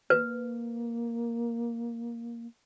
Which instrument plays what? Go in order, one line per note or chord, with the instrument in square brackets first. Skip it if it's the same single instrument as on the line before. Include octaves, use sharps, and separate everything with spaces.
[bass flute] A#3 [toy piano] B4